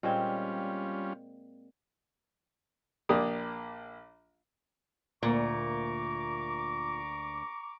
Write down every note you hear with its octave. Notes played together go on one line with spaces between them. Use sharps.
A#2 G3 G#3 C4 C#4 F4
A#1 A#3 G4 D5 D#6
D2 A#2 A#3 A#5 C#6 D6